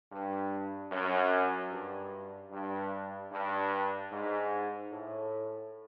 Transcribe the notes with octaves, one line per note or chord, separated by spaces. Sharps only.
G2
F#2
G2
G2
G2
G#2
A2